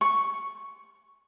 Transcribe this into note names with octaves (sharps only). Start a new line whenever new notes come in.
C#6